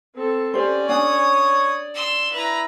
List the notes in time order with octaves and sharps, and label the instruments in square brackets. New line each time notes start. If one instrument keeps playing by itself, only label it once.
[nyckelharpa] C4 A4
[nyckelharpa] C#4 D5 [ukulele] G4 C5
[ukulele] D4 G#5 [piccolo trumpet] C#5 [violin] D#6
[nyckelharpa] D5
[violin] C6 E6
[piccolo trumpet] E4 [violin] B4 A#5